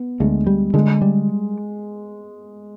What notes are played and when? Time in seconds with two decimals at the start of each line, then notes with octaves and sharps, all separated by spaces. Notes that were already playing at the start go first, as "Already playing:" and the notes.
Already playing: B3
0.20 D2 G#3
0.47 G3
0.74 D3 G#3
1.02 G3